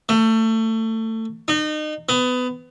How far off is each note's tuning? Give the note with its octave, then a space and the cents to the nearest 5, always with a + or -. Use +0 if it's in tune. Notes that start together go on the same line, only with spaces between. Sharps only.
A3 +25
D#4 -30
B3 +25